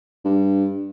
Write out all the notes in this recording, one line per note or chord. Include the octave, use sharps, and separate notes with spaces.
G2